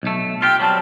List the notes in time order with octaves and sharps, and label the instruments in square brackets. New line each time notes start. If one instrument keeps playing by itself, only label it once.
[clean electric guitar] B1 A3
[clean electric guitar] F4 G4 [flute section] G5 E6 F6
[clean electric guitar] F#3 G3 C4 [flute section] A5